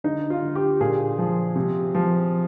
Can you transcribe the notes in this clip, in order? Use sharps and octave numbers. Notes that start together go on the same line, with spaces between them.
D3 D#4
F4
D3
G4
A#2 G#4
F3
C3
F3